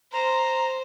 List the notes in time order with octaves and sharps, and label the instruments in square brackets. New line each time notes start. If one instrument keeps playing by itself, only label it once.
[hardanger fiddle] C5 [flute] A#5